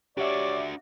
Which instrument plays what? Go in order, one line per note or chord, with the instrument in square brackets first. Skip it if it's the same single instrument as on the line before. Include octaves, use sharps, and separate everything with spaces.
[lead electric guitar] D4 F#4 [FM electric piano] G4 E5 [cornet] C#5 [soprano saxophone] D5